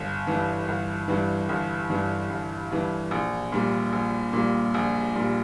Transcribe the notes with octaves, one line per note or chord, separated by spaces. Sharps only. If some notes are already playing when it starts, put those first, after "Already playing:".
Already playing: G1
G2 E3
G1
G2 E3
G1
G2 E3
G1
G2 E3
A#1
A#2 G3
A#1
A#2 G3
A#1
A#2 G3